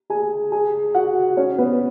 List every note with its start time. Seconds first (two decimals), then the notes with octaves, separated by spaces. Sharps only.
0.10 G#4 G#5
0.52 G#4 G#5
0.94 F#4 F#5
1.37 C#4 C#5
1.58 B3 B4